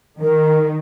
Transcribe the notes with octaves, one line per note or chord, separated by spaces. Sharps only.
D#3 A#4